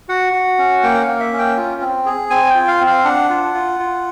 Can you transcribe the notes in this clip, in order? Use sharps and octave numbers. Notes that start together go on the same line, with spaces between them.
F#4 F#5
F#4
C#4
A#3 G5
F#5
F5
A#3
E5
C#4
G5
F4
C4
G#4
C4 G#5
F4 G5
F5
C4
F5
D4 F#5
F4
F4
F4